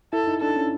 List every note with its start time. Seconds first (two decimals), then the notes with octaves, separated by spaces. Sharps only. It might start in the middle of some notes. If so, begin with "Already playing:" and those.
0.13 E4 A4
0.27 D#4
0.41 D4 A4
0.57 C#4